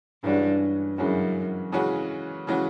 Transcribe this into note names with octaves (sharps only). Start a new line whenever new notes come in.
G2 C#3 E3 G#3 C#4 F#4
F#2 C#3 E3 G#3 C#4 F#4
C#3 E3 G#3 C#4 F#4
C#3 E3 G#3 C#4 F#4